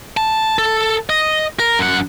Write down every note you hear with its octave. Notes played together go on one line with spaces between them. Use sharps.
A5
A4
D#5
A#4
F#2 F#5